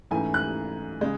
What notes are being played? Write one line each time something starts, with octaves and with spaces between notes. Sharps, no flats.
G#2 E3 A3 C#4 G#5
F#6
C#3 G#3